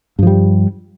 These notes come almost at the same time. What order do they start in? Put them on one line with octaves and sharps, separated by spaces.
G2 F3 G3